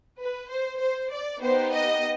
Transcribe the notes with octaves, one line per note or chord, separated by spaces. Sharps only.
B4
C5
C5
D5
B3 D#4 G4 C5
D#5